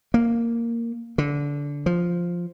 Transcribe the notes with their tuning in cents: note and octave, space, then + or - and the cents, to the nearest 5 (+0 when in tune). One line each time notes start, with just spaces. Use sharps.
A#3 -5
D3 -20
F3 +0